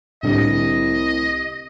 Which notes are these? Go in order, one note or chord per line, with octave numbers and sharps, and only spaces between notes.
C2 A2 D3 G3 D#5